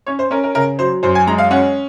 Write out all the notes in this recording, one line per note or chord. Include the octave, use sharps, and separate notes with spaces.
C#4 C#5
C5
C#4 A#4
A#4
C#3 A#4
F#3 C5
F#2 C5
G#5
G#3 A#5
F5
C#4 F#5